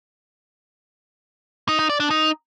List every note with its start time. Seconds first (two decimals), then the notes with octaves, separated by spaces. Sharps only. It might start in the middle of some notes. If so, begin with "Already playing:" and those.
1.69 D#4
1.79 D#4
1.90 D5
2.00 D4
2.11 D#4